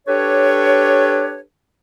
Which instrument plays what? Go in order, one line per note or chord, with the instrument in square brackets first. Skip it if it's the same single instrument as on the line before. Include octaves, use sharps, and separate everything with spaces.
[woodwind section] D4 G4 A4 B4 C#5